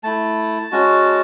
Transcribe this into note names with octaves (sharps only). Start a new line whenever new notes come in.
A3 E4 A5
G#3 C#4 F#4